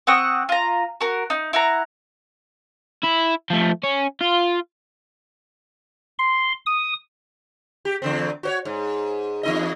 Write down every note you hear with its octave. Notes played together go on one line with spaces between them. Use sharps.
C4 F#5 C#6 D#6
F4 A#5
F#4 A#4
D#4
E4 F#5 A#5
E4
F3 A3
C#4
F4
C6
D#6
G4
E2 D3 C4
F#4 C5 C#5
G#2
E2 D#4 D#5